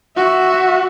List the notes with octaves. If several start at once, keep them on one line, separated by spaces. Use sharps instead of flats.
F#4 E5